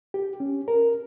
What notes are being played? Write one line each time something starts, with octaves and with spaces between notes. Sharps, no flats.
G4
C#4
A#4